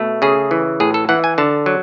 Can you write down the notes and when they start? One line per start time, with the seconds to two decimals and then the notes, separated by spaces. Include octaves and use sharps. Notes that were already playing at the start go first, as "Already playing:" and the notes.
Already playing: B2 A3
0.22 C#3 G#4
0.51 E3
0.80 A2 G#4
0.94 A4
1.09 E3 F#5
1.24 G#5
1.38 D3 A5
1.66 F#3